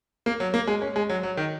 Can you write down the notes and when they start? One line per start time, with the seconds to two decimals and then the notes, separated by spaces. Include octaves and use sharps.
0.26 A#3
0.40 F#3
0.54 A#3
0.67 G#3
0.82 C#4
0.96 G#3
1.09 F#3
1.23 F#3
1.37 D#3